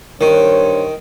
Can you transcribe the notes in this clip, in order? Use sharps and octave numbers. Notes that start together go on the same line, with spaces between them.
G2 D#3 C5 C#5